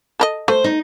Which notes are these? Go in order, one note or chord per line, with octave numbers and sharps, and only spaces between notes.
A4 A#4 D#5
A3 C5
D#4